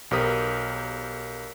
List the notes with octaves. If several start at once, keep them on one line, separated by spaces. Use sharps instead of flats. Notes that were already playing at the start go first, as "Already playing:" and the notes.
B1 G4 A#4 C5 D#6 B6